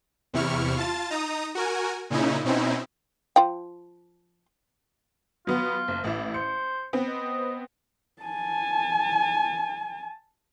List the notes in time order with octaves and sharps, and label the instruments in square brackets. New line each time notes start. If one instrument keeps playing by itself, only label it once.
[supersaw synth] E2 C3 E4 C#6 F6
F4 A5 A6
D#4 A#5 D#6
F#4 A#4 G#5
A#2 C#3 C#4 D#4 E4
B2 C4 C#4 D#4 E4
[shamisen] F3 F4 G5
[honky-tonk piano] F#3 B3 [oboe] F4
[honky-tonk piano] F#1
A1 E4
[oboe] C5 [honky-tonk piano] C#7
[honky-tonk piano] B3 C4
[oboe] D#5
[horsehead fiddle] G#5 A5